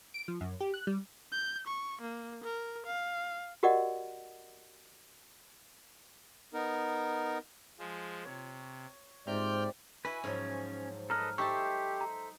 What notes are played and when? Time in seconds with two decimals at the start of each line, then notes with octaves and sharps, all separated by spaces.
0.14 D7
0.28 F3
0.41 F#2
0.60 G4
0.74 F#6
0.87 G3
1.32 G6
1.67 C#6
2.02 A#3
2.44 A#4
2.86 F5
3.63 F#4 G4 A#4 D5 D#5 F#5
6.54 B3 D#4 A#4
7.79 F3 G#3
8.25 C3 C#5
9.27 G#2 C3 D5 G5 F6 G6
10.05 E4 F#4 B4 G#5
10.24 G#2 F3 F#3 C#4
11.10 A4 B4 D#5 A#5 F6
11.38 D#4 G4 A4 C5 E5 A5 C#6
12.01 A#5